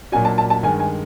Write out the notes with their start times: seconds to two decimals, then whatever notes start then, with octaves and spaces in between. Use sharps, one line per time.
0.12 A#2 F#3 A#3 D4 F#4 G#5
0.25 A5
0.38 A5
0.50 A5
0.63 G2 D#3 G#3 G#5
0.79 G#5